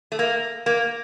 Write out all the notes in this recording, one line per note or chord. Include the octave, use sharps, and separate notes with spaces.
A3
A#3
A#3